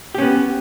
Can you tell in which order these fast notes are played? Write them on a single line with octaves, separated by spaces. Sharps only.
G4 C#4 B3